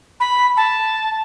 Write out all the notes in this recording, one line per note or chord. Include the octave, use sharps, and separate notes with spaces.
B5
A5